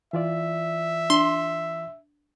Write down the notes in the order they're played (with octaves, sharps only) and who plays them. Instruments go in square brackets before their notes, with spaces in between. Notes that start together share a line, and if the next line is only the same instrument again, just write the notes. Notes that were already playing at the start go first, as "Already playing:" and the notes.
[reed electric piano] E3 F4 D5 [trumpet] E5
[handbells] D4 [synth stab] C6